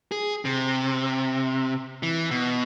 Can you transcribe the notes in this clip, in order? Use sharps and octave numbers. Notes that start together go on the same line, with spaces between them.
G#4
C3
E3
B2